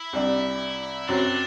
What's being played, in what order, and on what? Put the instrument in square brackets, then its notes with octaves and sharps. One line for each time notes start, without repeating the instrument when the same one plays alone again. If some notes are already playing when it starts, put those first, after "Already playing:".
Already playing: [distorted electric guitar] E4
[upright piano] C2 C3 G3 D4
[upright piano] F#2 F#3 C4 F#4 [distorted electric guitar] D4